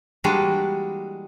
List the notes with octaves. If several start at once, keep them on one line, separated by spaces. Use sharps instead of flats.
E3 G3 G#3 A#3 D4 F#4